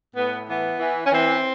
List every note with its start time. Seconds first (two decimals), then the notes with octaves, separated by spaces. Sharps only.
0.15 A2 B3
0.48 E3 B3
0.79 E3
1.05 C#4
1.11 E3 C4